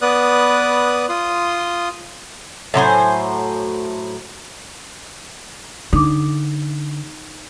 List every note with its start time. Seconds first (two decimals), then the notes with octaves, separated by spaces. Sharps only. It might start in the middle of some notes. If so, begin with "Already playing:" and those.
0.02 B3 B4 D5 D#6 F#6
1.09 F4 C6 D#6
2.74 A2 F#3 C5 G#5
5.93 D3 D#4 D6